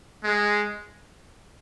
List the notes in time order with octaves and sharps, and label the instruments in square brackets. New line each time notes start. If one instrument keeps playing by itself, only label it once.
[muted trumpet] G#3